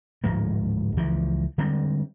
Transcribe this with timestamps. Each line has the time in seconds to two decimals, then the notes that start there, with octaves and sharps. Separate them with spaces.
0.24 D1 G#2 F3 G#3
0.97 C#2 E3 F3
1.58 D3 G3 G#3 C4